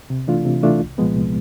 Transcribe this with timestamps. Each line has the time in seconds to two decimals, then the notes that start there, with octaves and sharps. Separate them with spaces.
0.10 C3
0.27 E3 A3 D4 F4
0.45 C3
0.63 E3 A3 D4 F4
0.80 C2
0.98 A#2 F3 G#3 B3
1.15 C2